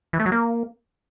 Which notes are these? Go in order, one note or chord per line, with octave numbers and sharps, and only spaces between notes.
E3
A3
F#3
A#3